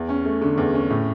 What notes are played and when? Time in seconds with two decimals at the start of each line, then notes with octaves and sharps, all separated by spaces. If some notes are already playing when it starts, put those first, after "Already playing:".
Already playing: E2
0.09 C#4
0.25 A3
0.42 D3
0.58 E2
0.74 C#4
0.90 A2